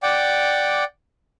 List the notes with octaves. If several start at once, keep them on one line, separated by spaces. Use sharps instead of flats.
D5 F#5 G5 D6